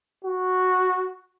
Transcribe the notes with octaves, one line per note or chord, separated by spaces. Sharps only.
F#4